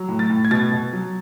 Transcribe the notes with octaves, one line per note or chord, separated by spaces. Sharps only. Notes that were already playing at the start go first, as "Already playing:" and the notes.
Already playing: F#3
A2
A6
A2
G#6
B2 A6
B2
F#3